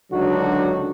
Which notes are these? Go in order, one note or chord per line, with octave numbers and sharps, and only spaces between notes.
C#2 D3 F#3 D4 D#4 F#4